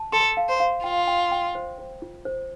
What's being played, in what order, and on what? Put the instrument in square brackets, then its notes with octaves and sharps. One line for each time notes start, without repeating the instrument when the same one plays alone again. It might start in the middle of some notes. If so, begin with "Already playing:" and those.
Already playing: [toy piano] A5
[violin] A4 [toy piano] C6
[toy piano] F5
[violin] C5
[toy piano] F5
[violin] F4 [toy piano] G5
[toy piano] G5
G5
C5
C5
F4
C5